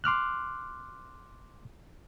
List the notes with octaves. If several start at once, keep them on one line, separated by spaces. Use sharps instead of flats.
C6 D6 F6 F#6